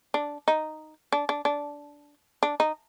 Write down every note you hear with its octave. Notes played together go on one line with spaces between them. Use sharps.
D4
D#4
D4
D4
D4
D4
D#4